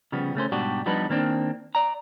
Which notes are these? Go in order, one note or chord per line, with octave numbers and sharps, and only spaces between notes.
C#3 F3 G3 B3
C#3 A3 C#4 C5
G#2 B2 G3 D4 F#4 G4
F3 G3 B3 D4 D#4 B4
D#3 A#3 C4 D4
D5 A#5